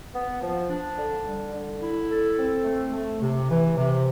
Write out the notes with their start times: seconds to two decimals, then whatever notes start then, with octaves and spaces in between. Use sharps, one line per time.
0.14 B3
0.42 F3
0.69 D4
0.98 D3
1.25 G3
1.54 D3
1.82 E4
2.10 A4
2.37 C4
2.65 A3
2.93 A3
3.21 C3
3.50 E3
3.77 C3